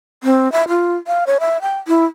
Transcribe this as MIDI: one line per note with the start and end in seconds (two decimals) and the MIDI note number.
0.23 0.51 60
0.52 0.64 76
0.69 0.96 65
1.07 1.24 77
1.27 1.38 73
1.40 1.61 76
1.62 1.78 79
1.88 2.05 64